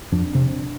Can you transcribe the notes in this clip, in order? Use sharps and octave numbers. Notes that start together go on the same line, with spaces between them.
F2 D4
C3